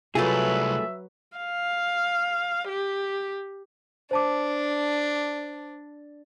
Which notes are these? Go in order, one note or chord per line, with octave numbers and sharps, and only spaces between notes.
C2 F#3 A3 F4 G#4 B4 E5
F5
G4
D4 C5 A5 D6